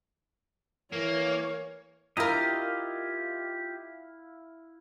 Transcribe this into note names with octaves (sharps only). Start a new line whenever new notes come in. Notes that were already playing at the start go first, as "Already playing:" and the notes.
E3 A#3 A#4 C#5
E4 F4 G4 A#4 D#5 F5 A#5